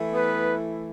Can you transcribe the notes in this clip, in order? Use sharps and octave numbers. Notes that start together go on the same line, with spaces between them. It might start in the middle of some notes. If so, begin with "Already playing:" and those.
Already playing: E3 A3 E4
B3 B4